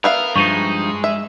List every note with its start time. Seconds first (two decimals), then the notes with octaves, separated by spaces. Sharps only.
0.04 B3 A#4 E5 F5
0.36 G2 F3 G#3 D#4 C#6 D#7
1.04 E5